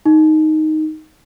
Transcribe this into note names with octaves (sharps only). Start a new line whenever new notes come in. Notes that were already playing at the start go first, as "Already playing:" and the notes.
D#4